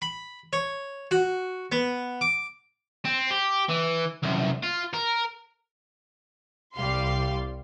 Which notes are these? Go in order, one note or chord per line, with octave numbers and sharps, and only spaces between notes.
B5
C#5
F#4
B3
D6
C4
G4
E3
C2 F#2
F4
A#4
C2 G3 F5 C6